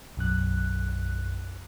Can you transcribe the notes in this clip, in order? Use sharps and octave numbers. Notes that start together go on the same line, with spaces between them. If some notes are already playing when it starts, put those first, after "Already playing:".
B1 F#2 F#6